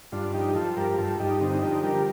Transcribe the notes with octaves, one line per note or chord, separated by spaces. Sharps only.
G2 D4 F4
F3 D#4 G4
F3 F4 A4
G2 G4 A#4
G2 F4 A4
G2 D#4 G4
D3 C4 D#4
F3 D#4 G4
G3 G4 A#4